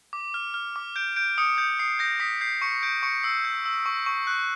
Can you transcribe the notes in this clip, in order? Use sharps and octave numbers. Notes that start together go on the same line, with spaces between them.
D6
F6
F6
D6
G6 D7
G6 D7
D#6 C#7
G6 C#7
D#6 C7
G6 A#6
D#6 B6
G6 C7
C#6 C#7
G6 D7
C#6 C#7
E6 C7
G6
E6
C#6
C#6
F#6